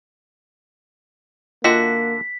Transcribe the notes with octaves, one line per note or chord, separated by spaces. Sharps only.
D3 A#3 F4 F#4 D#5 E5 G5 B6